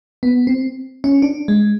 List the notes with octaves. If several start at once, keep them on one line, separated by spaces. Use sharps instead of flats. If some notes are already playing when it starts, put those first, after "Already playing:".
B3
C4
C#4
D4
G#3